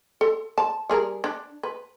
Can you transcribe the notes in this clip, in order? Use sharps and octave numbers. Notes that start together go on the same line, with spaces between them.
A4
A5
G3 G#4 A#4
D4
B4